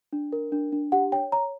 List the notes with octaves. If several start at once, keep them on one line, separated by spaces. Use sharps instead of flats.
D4
A#4
D4
D4
G4 F#5
C#5 G5
C#5 A#5